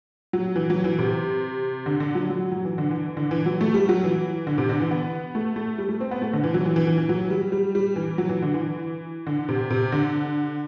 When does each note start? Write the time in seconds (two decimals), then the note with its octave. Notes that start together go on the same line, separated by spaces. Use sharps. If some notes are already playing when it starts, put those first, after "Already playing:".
0.33 F#3
0.56 E3
0.70 F#3
0.84 E3
0.99 C3
1.86 D3
2.00 D3
2.15 F#3
2.30 F#3
2.51 F#3
2.65 E3
2.78 D3
2.91 E3
3.17 D3
3.31 E3
3.46 F#3
3.61 A3
3.74 G3
3.89 F#3
4.04 E3
4.47 D3
4.58 C3
4.69 D3
4.81 E3
4.91 B3
5.35 A3
5.56 A3
5.78 G3
5.89 A3
6.00 C4
6.11 B3
6.22 A3
6.33 D3
6.44 E3
6.54 F#3
6.66 E3
6.76 E3
6.87 E3
6.98 E3
7.09 F#3
7.30 G3
7.52 G3
7.75 G3
7.96 E3
8.18 F#3
8.29 E3
8.42 D3
8.54 E3
9.27 D3
9.49 C3
9.70 C3
9.92 D3